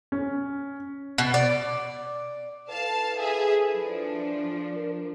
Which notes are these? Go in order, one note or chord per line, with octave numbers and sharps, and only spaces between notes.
C#4
B2
D5
E4 A4 B4 F5 A5
G#4 E5
F3 D4
A#4